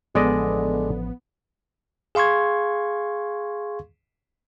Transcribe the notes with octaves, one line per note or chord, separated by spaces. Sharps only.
A1 D3 F3 G#3 B3 D5 D#5
G#4 F5 C6 C#6 G#6